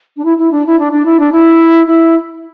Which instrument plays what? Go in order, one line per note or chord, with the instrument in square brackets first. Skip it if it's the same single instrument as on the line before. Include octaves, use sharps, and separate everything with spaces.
[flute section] D4
E4
E4
D4
E4
D4
D4
E4
D4
E4
E4